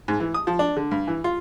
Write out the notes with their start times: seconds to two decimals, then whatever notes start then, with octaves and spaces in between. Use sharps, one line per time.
0.08 G#2
0.20 E3
0.34 D#6
0.47 F3
0.59 D4
0.77 D3
0.91 G2
1.08 E3
1.24 F4